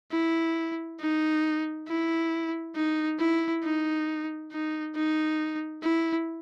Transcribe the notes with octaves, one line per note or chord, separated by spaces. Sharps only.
E4
D#4
E4
D#4
E4
D#4
D#4
D#4
E4